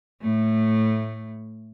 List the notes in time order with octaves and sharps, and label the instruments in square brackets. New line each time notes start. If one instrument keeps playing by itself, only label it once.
[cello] A2 A3